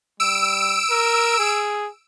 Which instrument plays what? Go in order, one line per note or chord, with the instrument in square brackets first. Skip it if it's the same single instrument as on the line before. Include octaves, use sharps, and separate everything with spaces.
[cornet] G3 [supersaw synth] E6 D7
[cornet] A#4
G#4